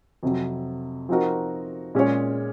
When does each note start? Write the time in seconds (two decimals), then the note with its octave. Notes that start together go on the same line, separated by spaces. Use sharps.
0.23 F2 C3 F#3
1.09 F3 C4 D#4 F#4 A#4
1.95 A#2 G#3 C#4 G#4 C#5